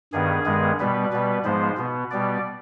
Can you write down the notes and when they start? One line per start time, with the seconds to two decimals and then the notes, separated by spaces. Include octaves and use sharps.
0.13 G2 D#3 B3 G#4
0.45 G2 D#3 G#3 B3
0.80 B2 G3 B3 B4
1.13 B2 G3 B3
1.44 G#2 F3 G#3 B3 C5
1.78 B2 B3
2.11 B2 G3 B3 D5